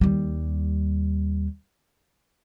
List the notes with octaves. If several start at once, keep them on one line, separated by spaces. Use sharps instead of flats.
D#2 G3